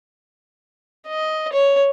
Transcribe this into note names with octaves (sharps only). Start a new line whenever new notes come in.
D#5
C#5